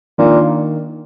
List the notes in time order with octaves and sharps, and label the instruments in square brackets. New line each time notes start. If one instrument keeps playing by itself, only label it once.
[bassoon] A#2 [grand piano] D#3 A#3 D4